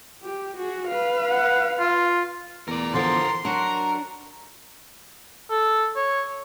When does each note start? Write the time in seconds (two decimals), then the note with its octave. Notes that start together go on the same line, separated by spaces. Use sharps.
0.23 G4
0.57 F#4 G#4
0.88 B4 F5
1.31 F#5
1.79 F4
2.68 E2 A#4 D5
2.94 D3 E3 F3 A4 A#4 C6
3.45 F#3 D4 F#4 A#4
5.50 A4
5.96 C#5